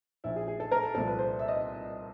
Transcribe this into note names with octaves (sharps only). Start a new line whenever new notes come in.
A#1 A#2 F3 E4
G#4
G#4
A4
A#4
A4
C2 A#2 F3 A4
B4
C5
E5
D#5